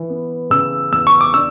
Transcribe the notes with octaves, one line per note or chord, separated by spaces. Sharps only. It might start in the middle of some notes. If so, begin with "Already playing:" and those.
Already playing: E3
B3
C#3 E6
E2 E6
C#6
D6
D4 E6